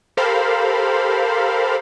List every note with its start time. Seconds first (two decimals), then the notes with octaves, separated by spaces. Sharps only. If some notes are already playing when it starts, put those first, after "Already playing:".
0.17 G4 A4 A#4 C5 F5 B5